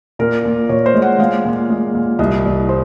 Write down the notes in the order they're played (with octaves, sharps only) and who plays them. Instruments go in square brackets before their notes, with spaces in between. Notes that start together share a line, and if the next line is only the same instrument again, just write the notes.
[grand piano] A#2 [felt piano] A#4
[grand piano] A#2
[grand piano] A#2 [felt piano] C#5
[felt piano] C5
[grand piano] G#3
[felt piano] F#5
[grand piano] G#3 [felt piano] F5
[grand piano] A#2
G#3
A#2
[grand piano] C2 [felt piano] D#5
[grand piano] C2
[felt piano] C5